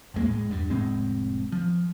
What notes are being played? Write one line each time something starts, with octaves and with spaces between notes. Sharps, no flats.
A#1 F2 G#3 A#3
A2 G#3
E2 G2
F1 A2 G#3 C4
F3